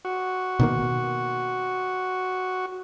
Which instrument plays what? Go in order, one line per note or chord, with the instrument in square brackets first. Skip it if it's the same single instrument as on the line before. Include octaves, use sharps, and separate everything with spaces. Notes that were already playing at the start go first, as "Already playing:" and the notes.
[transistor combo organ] F#4
[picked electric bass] B2 D#3 A#3